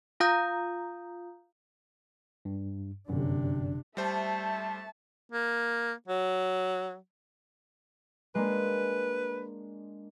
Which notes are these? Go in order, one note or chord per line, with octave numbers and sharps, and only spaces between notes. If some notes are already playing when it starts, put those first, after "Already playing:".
F4 F5 A#5 D#6 G6
G2
G1 F#2 C3 D4
G3 A3 C5 E5 A5
A#3
F#3
G#3 A#3 D4 B4